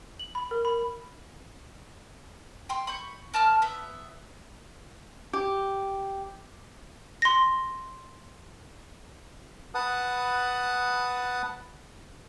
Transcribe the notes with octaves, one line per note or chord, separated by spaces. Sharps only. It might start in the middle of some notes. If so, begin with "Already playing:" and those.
F#7
B5
A#4
B5
G5 C6
B5 C#6 G6
A#4 A5 D6 F6
B3 E5
G4
C6 A#6
B4 F#5 A5 D#6